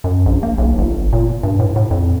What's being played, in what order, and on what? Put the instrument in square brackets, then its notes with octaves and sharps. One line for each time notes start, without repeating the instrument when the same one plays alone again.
[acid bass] F#2
A#1
A#3
B1
G1
A#2
G2
A2
A2
F2